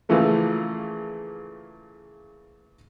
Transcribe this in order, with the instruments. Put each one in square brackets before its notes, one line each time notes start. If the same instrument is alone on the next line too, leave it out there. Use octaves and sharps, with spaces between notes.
[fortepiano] A#2 C#3 E3 F3 A3 A#3